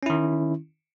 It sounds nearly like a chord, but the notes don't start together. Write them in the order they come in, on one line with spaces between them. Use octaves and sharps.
C#4 E4 D#3